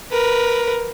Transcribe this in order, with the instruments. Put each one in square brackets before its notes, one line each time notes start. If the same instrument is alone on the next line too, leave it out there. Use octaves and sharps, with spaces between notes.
[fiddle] A#4 B4